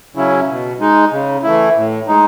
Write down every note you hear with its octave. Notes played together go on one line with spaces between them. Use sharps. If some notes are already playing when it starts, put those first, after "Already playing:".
C#3 F#3 C#4 E4
B2
G#3 D#4
C#3
E3 A3 E4
A2
G#3 D#4